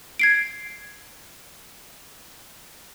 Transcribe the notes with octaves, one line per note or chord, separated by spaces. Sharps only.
G#6 C7 D7